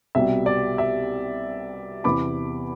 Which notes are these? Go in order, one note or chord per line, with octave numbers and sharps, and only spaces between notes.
C2 B2 G3 E5
D5
E5
E2 C3 E3 B5 D6